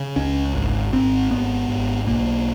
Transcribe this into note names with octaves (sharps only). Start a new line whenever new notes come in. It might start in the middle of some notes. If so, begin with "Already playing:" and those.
Already playing: C#3
C#2 C#4
G#1
G#1 C4
G#1 B3
G#1
B1 A#3